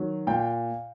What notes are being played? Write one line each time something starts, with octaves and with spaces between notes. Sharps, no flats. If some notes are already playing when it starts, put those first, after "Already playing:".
Already playing: D#3 F#3
A#2 G5